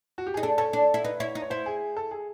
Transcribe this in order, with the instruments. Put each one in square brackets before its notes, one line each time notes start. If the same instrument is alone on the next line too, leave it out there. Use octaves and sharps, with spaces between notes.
[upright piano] F#4
G4
[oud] D#4 [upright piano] G#4
[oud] D4 [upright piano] A4
[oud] C#4 [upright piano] A4
[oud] D4
E4
[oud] D#4 [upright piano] B4
[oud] E4 [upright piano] C#5
[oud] D#4
[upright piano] C#5
[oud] E4 [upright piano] C5
[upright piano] G#4
A4
G#4